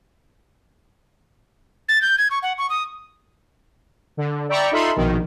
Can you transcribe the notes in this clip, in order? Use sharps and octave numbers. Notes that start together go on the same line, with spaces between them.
A6
G6
G#6
C#6
F#5
C#6
D#6
D3
D5 E5 G5 A#5 B5 C#6
D#4 F4 A4 E5 B5 C6
A#1 B2 D#3